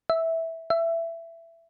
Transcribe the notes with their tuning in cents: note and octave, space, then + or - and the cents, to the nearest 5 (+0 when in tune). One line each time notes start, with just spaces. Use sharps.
E5 -10
E5 +15